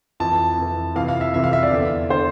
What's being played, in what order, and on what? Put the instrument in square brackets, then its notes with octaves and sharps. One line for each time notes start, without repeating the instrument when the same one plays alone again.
[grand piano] F2 E3 A5
F2 E3
F2 C3 E3 F5
F5
E5
F2 C3 E3 E5
F5
E5
D5
E2 D3
D3 C5